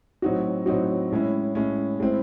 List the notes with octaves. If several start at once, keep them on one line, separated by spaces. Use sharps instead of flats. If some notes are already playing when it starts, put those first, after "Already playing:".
A2 F#3 C4 D#4 F#4
A2 F#3 C4 D#4 F#4
A2 G#3 C#4 E4
A2 G#3 C#4 E4
A2 G#3 C4 E4